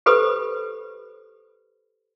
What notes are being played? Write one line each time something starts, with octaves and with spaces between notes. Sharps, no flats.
G4 A4 B4 C5 B5 D#6